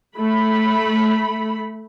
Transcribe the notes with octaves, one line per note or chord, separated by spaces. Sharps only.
A3 B5